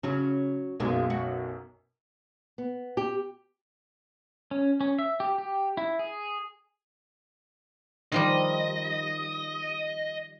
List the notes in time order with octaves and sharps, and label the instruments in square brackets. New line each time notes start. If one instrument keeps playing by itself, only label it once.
[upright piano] C#3 [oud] F#3 C#4
[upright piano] B1 F#2 B2 [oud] G#3 A#3
[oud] F#4
[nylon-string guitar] B3
G4
[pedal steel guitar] C#4
C#4
E5
G4
G4
E4
G#4
[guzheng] D#3 F3 G3 [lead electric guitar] D#5